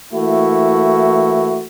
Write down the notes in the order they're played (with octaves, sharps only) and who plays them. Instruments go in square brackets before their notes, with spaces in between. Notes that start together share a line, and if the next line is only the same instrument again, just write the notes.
[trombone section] E3 A3 A#3 E4 F#4